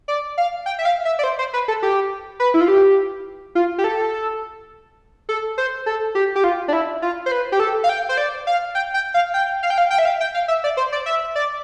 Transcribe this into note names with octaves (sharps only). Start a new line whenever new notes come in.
D5
F5
G5
E5
F5
E5
D5
C5
C5
B4
A4
G4
B4
E4
F4
G4
F4
G4
A4
A4
C5
A4
G4
G4
F4
D4
E4
F4
C5
B4
G4
A4
F5
G5
C5
D5
F5
G5
G5
F5
G5
F5
G5
F5
G5
E5
F5
G5
F5
E5
D5
C5
D5
E5
D5